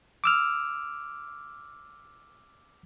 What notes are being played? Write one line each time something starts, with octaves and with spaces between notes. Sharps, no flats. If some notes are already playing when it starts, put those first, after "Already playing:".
D6 E6 F6